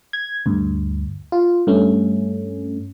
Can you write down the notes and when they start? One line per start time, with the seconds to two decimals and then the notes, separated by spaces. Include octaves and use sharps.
0.13 G#6
0.46 D2 G2
1.32 F4
1.67 G2 A3 C#4